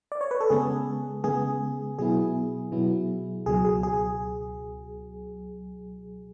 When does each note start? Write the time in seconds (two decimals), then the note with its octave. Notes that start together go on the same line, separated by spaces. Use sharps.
0.12 D5
0.21 C#5
0.31 B4
0.41 A4
0.50 C#3 G#3 B3 G#4
1.24 C#3 G#3 B3 G#4
1.99 B2 F#3 B3 E4 G#4
2.72 B2 F#3 B3 E4
3.46 C#2 B2 F#3 G#4
3.65 G#4
3.83 G#4